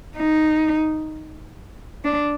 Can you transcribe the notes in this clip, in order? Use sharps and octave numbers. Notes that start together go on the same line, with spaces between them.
D#4
D4